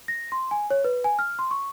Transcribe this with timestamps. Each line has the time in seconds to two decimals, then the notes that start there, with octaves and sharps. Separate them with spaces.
0.08 A#6
0.32 C6
0.51 G#5
0.71 C#5
0.84 B4
1.04 G#5
1.19 F6
1.39 C6
1.51 C#6